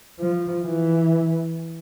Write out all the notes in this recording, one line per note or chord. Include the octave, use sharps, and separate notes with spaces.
F3
E3